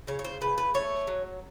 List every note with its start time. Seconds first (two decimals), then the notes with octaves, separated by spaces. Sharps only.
0.07 C#3 C#5
0.19 C#5
0.24 C5
0.41 C#3 B4
0.58 B4
0.74 A3 C#5
1.07 F#3